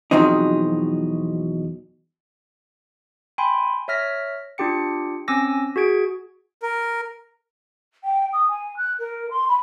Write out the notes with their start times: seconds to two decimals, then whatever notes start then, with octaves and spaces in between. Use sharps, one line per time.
0.11 E2 B2 F3 F#3 C4 D#4
3.38 G5 G#5 B5 C6
3.88 C#5 E5 F6 A#6 B6
4.58 D4 F4 G4 G5 C#7
5.28 C4 C#4 G#5 D6 E6 A#6
5.76 F#4 G#4 G#6 D7
6.63 A#4
8.04 G5
8.33 D#6
8.48 G#5
8.76 F#6
8.99 A#4
9.30 C6
9.48 B5